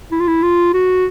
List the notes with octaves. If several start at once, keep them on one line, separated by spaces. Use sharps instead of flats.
E4
F4
E4
F4
F#4